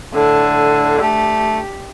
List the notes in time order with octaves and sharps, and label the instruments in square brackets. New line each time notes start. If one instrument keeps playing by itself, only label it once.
[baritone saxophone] A2 [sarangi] D3
[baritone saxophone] A3 [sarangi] G4